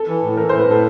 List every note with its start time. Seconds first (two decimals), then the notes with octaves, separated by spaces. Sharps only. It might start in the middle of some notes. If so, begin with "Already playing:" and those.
Already playing: A4
0.08 E3
0.23 A2
0.37 E3 A#4
0.49 A2 C5
0.59 B4
0.67 A2 A4